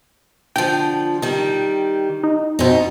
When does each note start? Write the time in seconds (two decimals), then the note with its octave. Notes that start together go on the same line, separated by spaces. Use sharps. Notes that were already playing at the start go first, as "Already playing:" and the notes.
0.56 D3 F3 G5
1.22 D#3 G3
2.23 D#4
2.59 F2 B2 C4 D#4